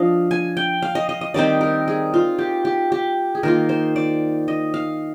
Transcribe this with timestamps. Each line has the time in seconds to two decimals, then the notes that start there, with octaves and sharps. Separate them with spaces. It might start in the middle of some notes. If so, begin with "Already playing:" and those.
Already playing: F3 D4 D#5 F5
0.31 G#5
0.57 G5
0.82 F5
0.95 D#5
1.09 D#5
1.21 D#5
1.34 D#3 G3 C4 D#4 D5
1.61 A#4
1.88 G#4
2.14 F4
2.39 G4
2.65 G4
2.92 G4
3.35 G#4
3.43 D#3 A#3 F4 A#4
3.69 C5
3.96 D5
4.48 D#5
4.74 F5